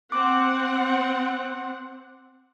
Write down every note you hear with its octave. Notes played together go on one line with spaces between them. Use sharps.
C4 F#5 D6